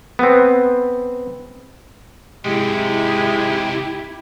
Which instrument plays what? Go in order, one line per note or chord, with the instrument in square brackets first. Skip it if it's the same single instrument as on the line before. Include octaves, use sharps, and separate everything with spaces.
[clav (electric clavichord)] B3 C4
[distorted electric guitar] G#2 C3 [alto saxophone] G#3 [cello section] E4 [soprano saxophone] G4